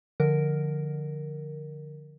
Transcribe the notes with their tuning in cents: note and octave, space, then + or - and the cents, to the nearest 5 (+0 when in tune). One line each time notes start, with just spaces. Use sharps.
D3 +10 F3 +0 A#4 +0